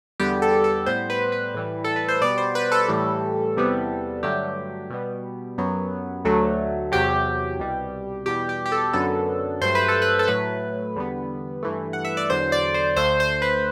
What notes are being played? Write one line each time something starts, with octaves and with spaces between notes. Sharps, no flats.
E2 D3 G3 B3 G4
A4
A4
A2 G3 B3 C5
B4
B4
A2 E3 G3
A4
B4
C5
B2 G3 B3 D5
C5
B4
A4
A2 E3 G3
E2 C3 G3 B3
G2 D3 F#3 A3 G4
B2 G3 B3
F#2 F#3 B3
D2 D3 F#3 A3
E2 C3 F#3 G4
C2 B2 G3
E2 B2 G3 G4
G4
G4
A4
F#2 D3 F#3 B3 A4
G2 F#3 A3 C5
B4
A4
B4
A4
A2 F#3 A3 B4
E2 D3 G3 B3
G2 E3 A3
F#5
E5
D5
E2 D3 F#3 C5
D5
C5
D2 D3 A3 C5
C5
B4